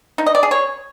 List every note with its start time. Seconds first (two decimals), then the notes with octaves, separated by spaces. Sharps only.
0.18 D#4
0.26 D#5
0.35 D5
0.43 G#4
0.51 C#5